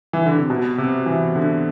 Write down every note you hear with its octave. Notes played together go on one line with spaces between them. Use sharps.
E3
D3
C3
B2
C3
E3
D3